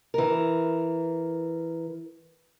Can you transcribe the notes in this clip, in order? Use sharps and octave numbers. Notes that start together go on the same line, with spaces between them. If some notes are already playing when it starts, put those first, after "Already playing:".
E3 A#4